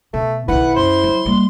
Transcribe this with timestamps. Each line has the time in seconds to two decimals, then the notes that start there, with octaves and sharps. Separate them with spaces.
0.14 B2 A3
0.48 B1 D#3 E4 B4 F#5
0.76 F#2 C5 C6
1.04 F#3
1.26 G3 A#3